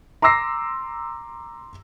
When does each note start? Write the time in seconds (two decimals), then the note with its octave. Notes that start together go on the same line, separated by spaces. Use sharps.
0.22 A#5 C6 D6 E6 A#6 C7